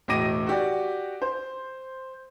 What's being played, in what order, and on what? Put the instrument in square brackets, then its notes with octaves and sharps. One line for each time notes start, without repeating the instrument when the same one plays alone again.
[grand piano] E1 A2 D#5 D6 A#6 D#7
F#4 G4 D5
C5